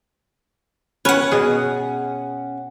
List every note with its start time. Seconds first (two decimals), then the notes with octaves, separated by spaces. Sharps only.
1.05 C#4 B4 C#5 F#5
1.32 B2 G#4